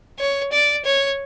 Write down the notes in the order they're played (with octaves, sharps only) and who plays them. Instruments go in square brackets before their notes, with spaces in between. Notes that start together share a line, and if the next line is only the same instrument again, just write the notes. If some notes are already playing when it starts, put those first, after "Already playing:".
[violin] C#5
D5
C#5